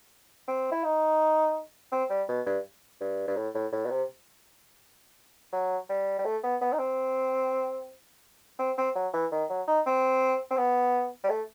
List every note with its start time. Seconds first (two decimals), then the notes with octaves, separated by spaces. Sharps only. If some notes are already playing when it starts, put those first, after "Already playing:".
0.47 C4
0.72 E4
0.84 D#4
1.92 C4
2.10 G3
2.28 B2
2.46 G2
3.01 G2
3.28 G2
3.37 A2
3.54 A2
3.72 A2
3.86 B2
3.90 C3
5.53 F#3
5.89 G3
6.19 G3
6.25 A3
6.43 B3
6.61 B3
6.73 D#4
6.79 C4
8.59 C4
8.78 C4
8.95 F#3
9.13 E3
9.32 D#3
9.50 F#3
9.68 D#4
9.86 C4
10.51 C4
10.57 B3
11.24 G3
11.30 A3